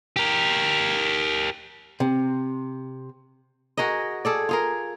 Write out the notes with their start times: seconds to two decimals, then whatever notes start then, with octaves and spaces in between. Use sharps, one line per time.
0.16 G4 A#4
2.00 C3
3.77 F#4 G#4 A#4 D#5
4.25 G#4 A4 D5
4.49 F4 G#4 A#4